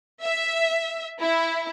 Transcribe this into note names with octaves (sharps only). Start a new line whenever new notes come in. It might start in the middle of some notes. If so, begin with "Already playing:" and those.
E5
E4